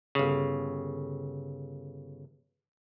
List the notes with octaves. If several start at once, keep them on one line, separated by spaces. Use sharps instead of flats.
G1 C#3